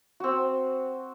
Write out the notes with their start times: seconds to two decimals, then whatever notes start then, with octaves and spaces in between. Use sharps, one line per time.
0.20 C4 F#4